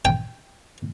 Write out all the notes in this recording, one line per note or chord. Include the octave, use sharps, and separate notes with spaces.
G5